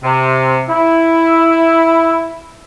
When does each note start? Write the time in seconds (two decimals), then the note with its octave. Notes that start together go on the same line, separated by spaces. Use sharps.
0.04 C3
0.69 E4